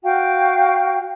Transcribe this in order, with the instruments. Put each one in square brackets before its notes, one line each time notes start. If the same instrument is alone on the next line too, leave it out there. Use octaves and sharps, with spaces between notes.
[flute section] F#4 F5 G5